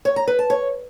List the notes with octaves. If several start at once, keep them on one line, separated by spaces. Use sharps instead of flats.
C#5
A#5
B4
A5
C#5